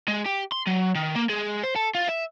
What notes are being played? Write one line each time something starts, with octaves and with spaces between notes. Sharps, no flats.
G#3
G4
C6
F#3
D#3
A#3
G#3
C5
A4
F4
E5